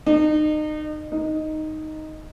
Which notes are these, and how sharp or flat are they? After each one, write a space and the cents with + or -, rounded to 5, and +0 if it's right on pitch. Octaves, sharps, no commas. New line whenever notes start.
D#4 -30
D#4 +0